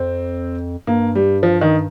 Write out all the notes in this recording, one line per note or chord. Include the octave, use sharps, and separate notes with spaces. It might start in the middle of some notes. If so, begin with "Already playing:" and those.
Already playing: F2 C4
G2 A#3
G3
F3
D#3